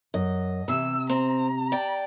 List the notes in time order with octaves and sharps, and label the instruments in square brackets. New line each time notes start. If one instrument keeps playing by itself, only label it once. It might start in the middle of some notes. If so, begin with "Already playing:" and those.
[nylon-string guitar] F#2 [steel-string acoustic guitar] D#5
[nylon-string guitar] C3 [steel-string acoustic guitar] E3 [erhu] E6
[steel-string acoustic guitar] C4 [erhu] A#5
[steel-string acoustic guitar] D5 G5